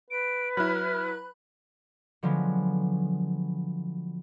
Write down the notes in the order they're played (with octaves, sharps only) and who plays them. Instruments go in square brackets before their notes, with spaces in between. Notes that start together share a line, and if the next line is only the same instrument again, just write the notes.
[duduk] B4 [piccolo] D7
[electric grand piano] F#3 E4 [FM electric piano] B5 F#6 [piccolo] F6
[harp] D3 F3 F#3 G#3 B3